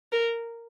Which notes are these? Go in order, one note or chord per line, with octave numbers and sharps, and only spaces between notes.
A#4